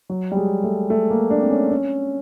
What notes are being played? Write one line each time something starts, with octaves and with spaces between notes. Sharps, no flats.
F#3
G3
G#3
A3
A3
A#3
D4
C4
C#4
C#4